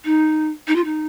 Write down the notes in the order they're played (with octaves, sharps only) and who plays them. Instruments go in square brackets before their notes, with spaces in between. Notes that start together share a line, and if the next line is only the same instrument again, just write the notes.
[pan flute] D#4
D#4
F4
D#4